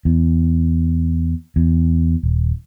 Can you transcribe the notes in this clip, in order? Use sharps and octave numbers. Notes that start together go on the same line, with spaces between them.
E2
E2
D#1